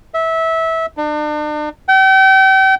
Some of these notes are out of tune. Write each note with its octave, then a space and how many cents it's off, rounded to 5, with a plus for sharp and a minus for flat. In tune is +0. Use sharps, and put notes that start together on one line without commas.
E5 -20
D4 +40
G5 -40